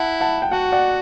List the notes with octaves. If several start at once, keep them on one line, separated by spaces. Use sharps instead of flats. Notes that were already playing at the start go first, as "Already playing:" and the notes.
Already playing: E4 F#5 A5
F#5 A5
G5
F#4 F#5 A5
D5 F#5